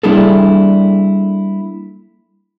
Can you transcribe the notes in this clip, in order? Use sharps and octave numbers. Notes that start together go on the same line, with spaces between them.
G3 A#3 D4 E4 G#4 A4